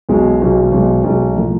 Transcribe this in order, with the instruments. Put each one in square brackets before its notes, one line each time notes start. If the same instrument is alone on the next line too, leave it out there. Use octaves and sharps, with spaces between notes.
[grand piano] B1 B2 G#3
B1 B2 G#3
B1 B2 G#3
B1 B2 G#3
A2 F3 A#3